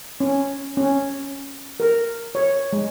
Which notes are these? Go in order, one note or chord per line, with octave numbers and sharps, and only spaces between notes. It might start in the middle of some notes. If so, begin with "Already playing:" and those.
C#4
C#4
A#4
C#5
G#3